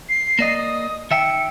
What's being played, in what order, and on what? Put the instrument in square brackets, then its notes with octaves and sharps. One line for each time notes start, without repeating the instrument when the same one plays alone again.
[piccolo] C7
[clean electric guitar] A#3 D5 D#5
[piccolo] D#6
[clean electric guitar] D#3 E5 G5 [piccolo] C#7